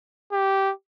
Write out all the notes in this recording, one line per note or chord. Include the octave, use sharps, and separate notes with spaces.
G4